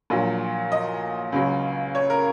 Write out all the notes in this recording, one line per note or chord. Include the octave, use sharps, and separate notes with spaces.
A#1 A#2 F#3
D#5
C#2 C#3 F#3
C#5
A#4